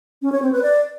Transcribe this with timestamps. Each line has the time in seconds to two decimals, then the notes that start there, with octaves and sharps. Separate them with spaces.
0.22 C#4
0.32 C#5
0.42 C4
0.52 B4
0.62 D5